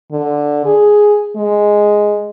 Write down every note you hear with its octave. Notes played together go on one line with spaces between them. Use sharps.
D3
G#4
G#3